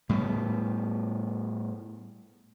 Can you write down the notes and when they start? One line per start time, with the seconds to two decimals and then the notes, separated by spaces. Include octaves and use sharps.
0.09 A2 G3 A3 B3